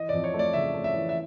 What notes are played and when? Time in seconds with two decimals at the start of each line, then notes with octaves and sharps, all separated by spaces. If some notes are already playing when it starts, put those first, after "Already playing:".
Already playing: E3 D#5
0.09 F2 D5
0.24 C#5
0.34 A3
0.39 D5
0.53 C#3 E5
0.74 A3
0.84 E5
0.93 E3
1.09 E5